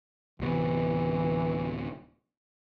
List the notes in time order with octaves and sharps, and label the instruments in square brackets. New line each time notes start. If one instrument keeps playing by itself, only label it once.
[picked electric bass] D1 C3 B3 [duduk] E3